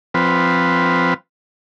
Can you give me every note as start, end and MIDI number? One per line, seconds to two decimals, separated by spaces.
0.14 1.14 53
0.14 1.14 60
0.14 1.14 71